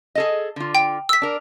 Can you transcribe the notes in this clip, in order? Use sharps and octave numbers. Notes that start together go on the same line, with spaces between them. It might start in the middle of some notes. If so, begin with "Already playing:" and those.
G#4 A4 D#5
D3 F4
G5
E6 B6
D4 A#4